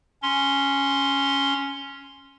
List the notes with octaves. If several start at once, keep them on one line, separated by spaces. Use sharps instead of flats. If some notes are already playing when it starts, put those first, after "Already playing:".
C#4 C6